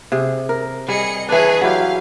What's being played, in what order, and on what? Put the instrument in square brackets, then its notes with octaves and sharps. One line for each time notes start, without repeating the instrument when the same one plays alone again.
[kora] C3 G#4
A#4
[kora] G3 [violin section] G#4 D#5 C#7
[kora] E3 D4 [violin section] G#4 B4 C#5
[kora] F#3 E4 G4 [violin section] F5